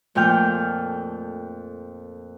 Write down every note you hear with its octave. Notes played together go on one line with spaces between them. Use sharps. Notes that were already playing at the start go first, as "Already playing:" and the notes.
F2 A#2 A3 G5 F6 G6